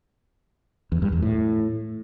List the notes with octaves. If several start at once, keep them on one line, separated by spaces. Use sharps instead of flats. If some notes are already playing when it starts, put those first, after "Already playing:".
E2
G2
E2
A2